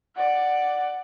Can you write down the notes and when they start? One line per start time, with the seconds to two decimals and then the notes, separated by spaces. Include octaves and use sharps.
0.15 D5 F#5